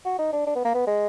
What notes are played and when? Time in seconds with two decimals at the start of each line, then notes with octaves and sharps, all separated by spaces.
0.05 F#4
0.19 D#4
0.33 D4
0.47 D4
0.55 B3
0.65 A#3
0.75 B3
0.87 G#3